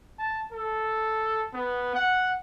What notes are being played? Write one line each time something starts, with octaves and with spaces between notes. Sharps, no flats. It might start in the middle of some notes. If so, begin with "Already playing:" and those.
A5
A4
B3
F#5